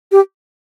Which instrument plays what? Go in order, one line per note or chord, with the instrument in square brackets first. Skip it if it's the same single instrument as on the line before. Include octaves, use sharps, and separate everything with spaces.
[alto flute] G4